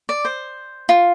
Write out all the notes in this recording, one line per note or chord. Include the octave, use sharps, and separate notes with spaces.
D5
C5
F4